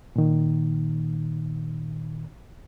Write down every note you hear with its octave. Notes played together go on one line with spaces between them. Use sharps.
A#2 D#3